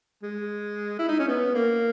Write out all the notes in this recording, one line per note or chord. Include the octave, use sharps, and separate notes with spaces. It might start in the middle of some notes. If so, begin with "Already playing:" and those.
G#3
E4
D#4
C#4
B3
A#3